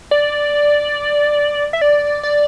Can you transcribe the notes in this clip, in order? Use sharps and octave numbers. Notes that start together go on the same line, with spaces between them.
D5
E5
D5
D5